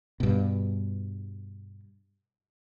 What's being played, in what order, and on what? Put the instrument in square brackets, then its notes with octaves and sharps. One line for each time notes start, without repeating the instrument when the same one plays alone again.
[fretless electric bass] G2 B2